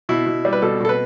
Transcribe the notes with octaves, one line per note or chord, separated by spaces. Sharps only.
B2 E4
B2
G3
B4
B2 A4
B2 A4
B4